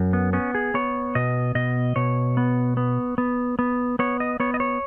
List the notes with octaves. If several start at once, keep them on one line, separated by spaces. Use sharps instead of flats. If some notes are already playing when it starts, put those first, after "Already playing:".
Already playing: F#2
B3
B3 C#4
G#4
B3 C#5
B2 D#5
B2 D#5
B2 C#5
B3
B3
B3
B3
B3 C#5
D#5
B3 C#5
D#5
C#5